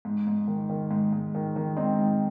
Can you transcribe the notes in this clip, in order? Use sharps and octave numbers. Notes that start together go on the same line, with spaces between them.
G#2
G#2
D#3
D#3
G#2
G#2
D#3
D#3
G#2 C4 D#4
G#2